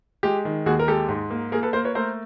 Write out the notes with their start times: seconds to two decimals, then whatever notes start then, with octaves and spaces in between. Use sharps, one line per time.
0.23 G#3 G4
0.45 D#3
0.66 D#2 F#4 G#4
0.79 A#4
0.87 G#3 G4 A4
1.09 G#2
1.30 A#3
1.52 A#3 G#4 A#4
1.63 A4 B4
1.73 A#3 A#4 C5
1.84 B4 C#5
1.95 A3 A#4 C5